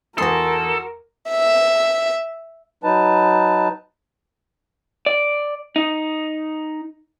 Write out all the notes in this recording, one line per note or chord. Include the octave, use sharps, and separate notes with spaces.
E2 F#4 A4 A#4 C6 D#6
E5
F#3 D#4 B4 A5
D5
D#4